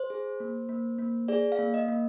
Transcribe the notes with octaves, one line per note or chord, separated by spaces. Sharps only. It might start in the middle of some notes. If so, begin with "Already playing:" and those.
Already playing: C5
G#4
A#3
A#3
A#3
G#4 D5
F5
A#3
D#5
A#3